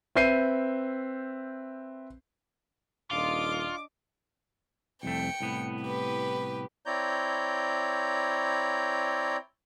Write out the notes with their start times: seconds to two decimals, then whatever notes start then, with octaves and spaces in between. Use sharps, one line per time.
0.15 C4 B4 E5 G6 C7 D#7
3.11 D#1 D4 F4 D#5 D6
5.03 C2 F2 A3 G5 C#7
5.40 C2 A2 B3
5.83 G4 B4
6.85 C4 E4 C#5 D5 A#5 G6